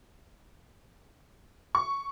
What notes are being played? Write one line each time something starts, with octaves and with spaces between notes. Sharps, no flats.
C#6